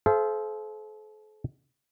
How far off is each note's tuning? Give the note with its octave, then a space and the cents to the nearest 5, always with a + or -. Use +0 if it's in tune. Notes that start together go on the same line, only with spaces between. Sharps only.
A4 -40 C5 +0 F5 -40